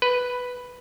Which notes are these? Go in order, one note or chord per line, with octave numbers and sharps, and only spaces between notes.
B4